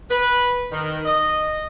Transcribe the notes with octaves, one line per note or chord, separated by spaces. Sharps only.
B4
D#3
D#5